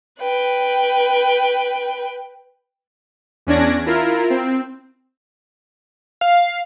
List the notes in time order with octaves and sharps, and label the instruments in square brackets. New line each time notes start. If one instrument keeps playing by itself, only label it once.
[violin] B4 G5
[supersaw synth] E2 C#4 D4 D5 G#6 A#6
E4 F4 A#4
C4
[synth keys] F5